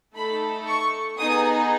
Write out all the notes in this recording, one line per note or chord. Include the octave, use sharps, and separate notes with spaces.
A3 D#4 A4 B5
C#6
B3 D#4 G#4 D#6